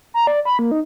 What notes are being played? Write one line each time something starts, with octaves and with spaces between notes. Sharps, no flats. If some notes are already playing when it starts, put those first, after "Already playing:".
A#5
D5
B5
A#3
D#4